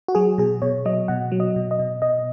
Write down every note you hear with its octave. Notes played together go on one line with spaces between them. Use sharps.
F#4
F#3 G#4
B2 G#4
B2 C#5
F#3 D#5
B2 F#5
F#3
D#5
B2
D#5
B2
B2 D#5